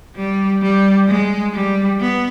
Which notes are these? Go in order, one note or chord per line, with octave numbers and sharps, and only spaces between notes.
G3
G3
G#3
G3
B3